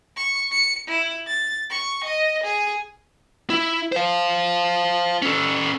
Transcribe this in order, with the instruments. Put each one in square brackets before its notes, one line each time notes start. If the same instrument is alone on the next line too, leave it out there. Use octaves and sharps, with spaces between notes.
[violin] C#6
C#7
E4
A6
C#6
D#5
G#4
[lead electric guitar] E4
C5 F5
C#4 A4